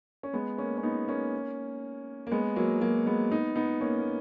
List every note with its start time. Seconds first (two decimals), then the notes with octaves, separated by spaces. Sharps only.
0.23 C#4
0.33 G#3 B3
0.58 A#3 C#4
0.78 C#4
0.83 B3 D#4
1.08 A#3 C#4
2.27 A#3
2.31 G#3 B3
2.56 F#3 A#3
2.81 F#3 A#3
3.06 G#3 B3
3.31 B3 D#4
3.56 B3 D#4
3.81 A#3 C#4
3.99 A#3